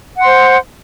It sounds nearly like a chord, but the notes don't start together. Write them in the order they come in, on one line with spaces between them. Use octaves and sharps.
F#5 C6 C5